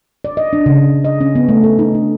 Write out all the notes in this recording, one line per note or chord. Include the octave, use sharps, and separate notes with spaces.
D5
D#5
D4
C#3
D#5
C#4
B3
A3
A4
D#4
D4